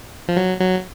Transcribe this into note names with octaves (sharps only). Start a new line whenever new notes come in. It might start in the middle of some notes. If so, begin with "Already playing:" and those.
F3
F#3
F#3